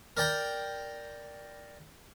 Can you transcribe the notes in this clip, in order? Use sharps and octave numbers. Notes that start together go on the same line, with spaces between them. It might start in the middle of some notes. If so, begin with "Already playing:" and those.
A#4 D5 G5 A#5